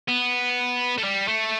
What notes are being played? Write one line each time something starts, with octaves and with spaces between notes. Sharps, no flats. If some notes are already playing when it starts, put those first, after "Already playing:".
B3
A3
G3
A3